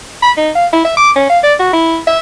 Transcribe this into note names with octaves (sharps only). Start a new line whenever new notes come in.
B5
D#4
F5
E4
E5
D6
C#4
F5
D5
F#4
E4
E5